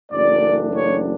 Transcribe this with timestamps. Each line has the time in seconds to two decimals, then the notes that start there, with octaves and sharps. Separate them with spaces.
0.12 F#1 F#2 E3 A3 D4 D5
0.76 C#5